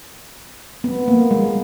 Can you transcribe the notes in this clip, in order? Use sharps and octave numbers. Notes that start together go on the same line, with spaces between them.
B3
A#3
G#3